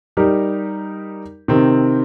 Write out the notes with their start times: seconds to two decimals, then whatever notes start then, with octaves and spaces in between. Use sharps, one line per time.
0.17 G3 D#4 G4 A#4
1.48 C3 D#3 C4